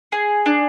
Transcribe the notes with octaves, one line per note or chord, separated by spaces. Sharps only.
G#4
D4